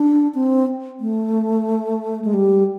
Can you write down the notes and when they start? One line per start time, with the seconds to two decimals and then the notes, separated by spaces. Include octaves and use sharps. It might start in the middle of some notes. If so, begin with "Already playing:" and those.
Already playing: D4
0.35 C4
1.00 A3
2.25 G#3
2.34 G3